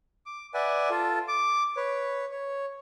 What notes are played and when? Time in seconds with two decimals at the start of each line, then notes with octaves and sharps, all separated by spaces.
0.26 D6
0.54 B4 D5 E5 F#5 G#5
0.90 F4 A4
1.28 D6
1.77 B4 C#5
2.31 C#5